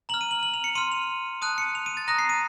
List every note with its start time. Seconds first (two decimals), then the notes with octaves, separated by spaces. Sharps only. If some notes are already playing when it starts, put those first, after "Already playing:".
0.09 A#5 F#7
0.14 F6
0.21 D#7
0.31 F#7
0.43 F#7
0.54 F7
0.64 C#7
0.75 C6 F6 D#7
0.92 F7
1.42 A5 D#6 F#6 D#7
1.58 C#7
1.75 F7
1.86 D#7
1.97 A6
2.08 A#5 D#6 F#6 A#6
2.19 C7
2.29 D#7